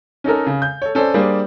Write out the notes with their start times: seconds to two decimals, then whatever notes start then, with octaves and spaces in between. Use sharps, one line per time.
0.24 C#4 D#4 A4 A#4
0.47 C#3
0.62 G6
0.82 A4 C#5
0.95 C#4 A4 C5 D5
1.14 G3 A#3 D4 G#4 C5